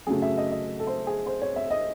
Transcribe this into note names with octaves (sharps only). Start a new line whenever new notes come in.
F#2 C#3 F#3 A3 G#4
E5
D#5
D#5
A4
C5
G#4
C5
C#5
E5
D#5